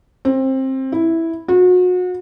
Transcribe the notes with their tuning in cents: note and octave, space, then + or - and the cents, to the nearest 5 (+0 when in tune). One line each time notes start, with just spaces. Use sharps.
C4 +20
E4 -5
F#4 -35